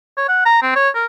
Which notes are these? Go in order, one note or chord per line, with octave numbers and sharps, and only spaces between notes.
C#5
F#5
A#5
C4
C#5
A#4